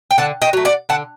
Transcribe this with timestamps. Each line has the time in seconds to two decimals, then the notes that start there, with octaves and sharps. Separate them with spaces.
0.11 G5
0.18 D3 F#5 A5
0.42 D#5 G5
0.53 F#3 A3
0.65 D5 F#5
0.89 D3 F#5 A5